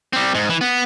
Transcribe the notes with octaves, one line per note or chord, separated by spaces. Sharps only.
G3 C4
G#2
E3
B3